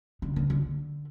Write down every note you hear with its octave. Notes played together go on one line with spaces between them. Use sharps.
D3
D3
D3